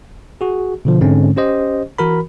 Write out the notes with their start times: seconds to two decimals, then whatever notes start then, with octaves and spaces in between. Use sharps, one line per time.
0.41 F#4 G#4
0.85 B2 D3 F3
1.01 G#2 D3 G#3 C4 C#4
1.37 C#4 G4 C5 D#5
1.98 E3 F#4 A#4 B5